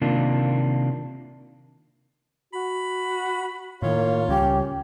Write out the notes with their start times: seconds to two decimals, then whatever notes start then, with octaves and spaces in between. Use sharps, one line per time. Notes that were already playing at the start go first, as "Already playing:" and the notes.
0.01 C3 D#3 A#3 D4 F4
2.53 F#4 B5
3.82 A2 D#3 A#3 F4 C#5
4.29 C#2 C#3 G3 C#4 G4